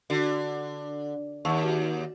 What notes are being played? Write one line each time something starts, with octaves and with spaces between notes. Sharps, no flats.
D3 F#4
D#2 A5 C#6 E6
F#4 A5